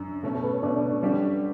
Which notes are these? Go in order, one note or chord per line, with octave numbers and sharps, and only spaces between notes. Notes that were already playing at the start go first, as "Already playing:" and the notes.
Already playing: F#2 D4
B2 A3 C#4
A4
B4
C#5
B2 A3 C#4 D4 D5
D3 G3 C#4 G4